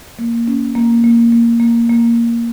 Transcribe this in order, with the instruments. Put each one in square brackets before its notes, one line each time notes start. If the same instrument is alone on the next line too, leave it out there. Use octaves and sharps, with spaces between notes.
[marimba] A#3
C#4
A#3
A#3
A#3
A#3
A#3